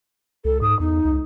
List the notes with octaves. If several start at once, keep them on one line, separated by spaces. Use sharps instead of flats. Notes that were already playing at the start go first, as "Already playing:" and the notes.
C#2 A4
G#2 D#6
E2 D#4
C#2